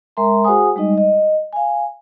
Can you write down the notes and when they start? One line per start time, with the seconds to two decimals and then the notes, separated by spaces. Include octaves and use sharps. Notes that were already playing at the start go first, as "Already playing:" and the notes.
0.17 G#3 A#4 E5 A#5 C6
0.44 F#4 G#4 C5 F#5 G#5 D#6
0.76 G3 G#3 D#4 D#5
0.98 D#5
1.53 F5 G#5